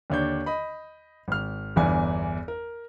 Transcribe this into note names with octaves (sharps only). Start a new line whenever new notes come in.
D#2 D3 D4 C#5 G6
D#5 B5
G#1 F6
G1 E2 E3 G#5
A#4